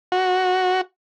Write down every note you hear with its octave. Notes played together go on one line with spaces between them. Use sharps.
F#4